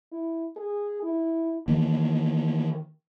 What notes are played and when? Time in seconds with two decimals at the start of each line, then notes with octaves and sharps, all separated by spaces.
0.12 E4
0.56 G#4
1.03 E4
1.68 D#3 E3 A#3